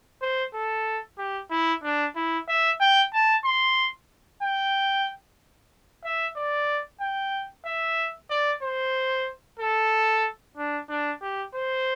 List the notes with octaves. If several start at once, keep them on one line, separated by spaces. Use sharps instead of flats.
C5
A4
G4
E4
D4
E4
E5
G5
A5
C6
G5
E5
D5
G5
E5
D5
C5
A4
D4
D4
G4
C5